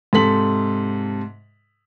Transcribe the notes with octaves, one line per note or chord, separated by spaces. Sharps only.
G#2 C3 A4 B6 F#7